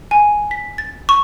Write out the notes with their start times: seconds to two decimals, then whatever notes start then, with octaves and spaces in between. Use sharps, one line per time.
0.11 G#5
0.51 B6
0.78 A6
1.09 C#6